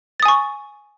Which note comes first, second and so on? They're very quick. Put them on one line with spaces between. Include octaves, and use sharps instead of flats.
A6 D#6 G#5 C#6